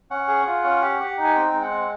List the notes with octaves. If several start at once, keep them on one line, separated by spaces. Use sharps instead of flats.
C#4 F#5
G#4
F4
C#4
G4
G4
D#4
G#5
C4 G5
G#3
F#5
C4